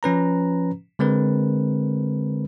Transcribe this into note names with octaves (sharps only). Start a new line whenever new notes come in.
F3 C#4 B4 A#5
D3 G#3 C4 A#4 B4